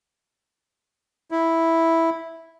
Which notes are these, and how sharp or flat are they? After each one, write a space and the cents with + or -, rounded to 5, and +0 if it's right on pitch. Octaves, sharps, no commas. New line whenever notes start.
E4 -5